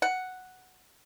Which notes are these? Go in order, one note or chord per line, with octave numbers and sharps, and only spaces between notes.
F#5